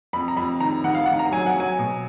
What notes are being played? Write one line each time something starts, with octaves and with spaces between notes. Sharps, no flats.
F2 B5
A#5
F2 B5
D#3 A#5
D#3 F#5
F5
D#3 F#5
A#5
F#3 G#5
F#5
F#3 G#5
B2